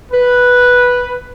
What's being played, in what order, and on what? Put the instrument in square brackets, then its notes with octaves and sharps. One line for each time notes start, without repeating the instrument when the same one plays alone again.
[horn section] B4